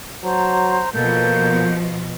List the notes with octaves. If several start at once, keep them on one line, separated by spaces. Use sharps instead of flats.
F#3 C5 A5 A#5
B2 F3 A#3 A4 G6